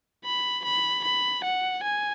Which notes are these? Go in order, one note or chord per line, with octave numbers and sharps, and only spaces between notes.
B5
B5
B5
F#5
G#5